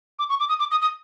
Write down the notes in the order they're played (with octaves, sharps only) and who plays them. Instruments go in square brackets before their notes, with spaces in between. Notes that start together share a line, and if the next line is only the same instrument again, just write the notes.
[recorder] D6
C#6
D6
D#6
D6
D#6
D#6